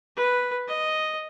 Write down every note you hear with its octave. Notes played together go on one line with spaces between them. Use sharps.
B4
D#5